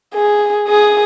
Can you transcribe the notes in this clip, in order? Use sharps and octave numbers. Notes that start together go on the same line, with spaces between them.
G#4
G#4 D#6